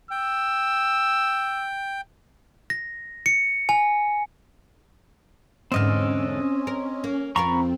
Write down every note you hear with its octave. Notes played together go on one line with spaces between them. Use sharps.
G5 E6
A#6
C#7
G#5
E2 G#2 D3 C4 C#4 D#5 F6
A#4
A#3
F2 C4 F4 A#4 A#5 B5 C#6